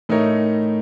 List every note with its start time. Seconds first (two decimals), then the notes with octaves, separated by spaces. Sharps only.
0.09 A2 A3 D#4 A#4 C#5